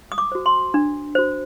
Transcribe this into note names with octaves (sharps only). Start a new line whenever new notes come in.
D#6
D6
F#4 C5
C6
D4
F#4 C5